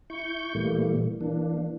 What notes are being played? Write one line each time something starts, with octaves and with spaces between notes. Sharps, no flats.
E4 C#6 G6
A#2 E3 G3 A3 A#3
E3 A#3 D4